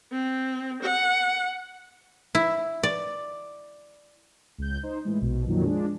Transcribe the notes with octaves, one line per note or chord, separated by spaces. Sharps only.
C4
F#5
E4
D5
C#2 G6
D#4 C5
A2 E3 G#3
A#1 B2
F2 A#2 D#3 F#3
F3 G#3 D4